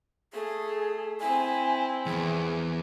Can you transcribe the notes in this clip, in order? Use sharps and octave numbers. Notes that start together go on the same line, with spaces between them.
A3 G#4
C4 E4 G#5
E2 G#4